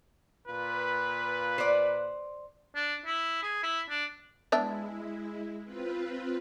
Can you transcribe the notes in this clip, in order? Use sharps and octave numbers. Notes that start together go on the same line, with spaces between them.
A#2 F4 B4
C5 D5
D4
E4
G#4
E4
D4
G#3 B3 D4 E4 E5
C4 F4 B4